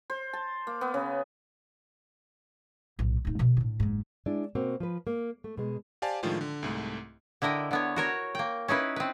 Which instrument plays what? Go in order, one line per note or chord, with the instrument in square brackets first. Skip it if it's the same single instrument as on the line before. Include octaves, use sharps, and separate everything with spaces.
[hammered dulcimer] C5
A5
A#3
B3
C#3
[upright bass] B1 A2
D1 D#4
B2 D3
A2 D4
F#1 G#2
[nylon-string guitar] G#3 D4 E4 D5
B2 A#3 C4 F#4
F3 B4
A#3
A3
B2 G#3
[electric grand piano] G4 C5 D5 F5 G#5 A5
A2 D#3 F3 G#3 D4 F4
D3
C2 G#2 A3
[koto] D3 E4 A#4 D#5 G5
D3 B3 C#5
F#4 A#4 C#5
A#3 G5
C#4 D#4 E4 B4
C4 B4